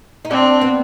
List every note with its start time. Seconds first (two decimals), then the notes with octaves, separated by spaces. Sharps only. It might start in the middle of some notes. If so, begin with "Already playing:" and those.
0.25 D#4
0.31 C4 D4
0.61 B3